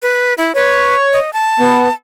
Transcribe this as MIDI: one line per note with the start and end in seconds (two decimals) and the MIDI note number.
0.03 0.34 71
0.38 0.52 64
0.55 0.95 71
0.55 1.19 73
1.13 1.33 75
1.33 1.93 81
1.60 1.88 59